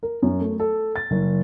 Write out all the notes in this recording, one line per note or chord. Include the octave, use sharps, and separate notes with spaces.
A#4
F#2
A3
A4
A6
F#1